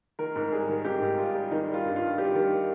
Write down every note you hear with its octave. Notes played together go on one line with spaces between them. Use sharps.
D#3 A#4
G#2
G3 G#4
D#3
G#2 G4
G#2
G3 F4
G3
D#3 D#4
G3
F4
G2
F4
G2
G3 G4
D#3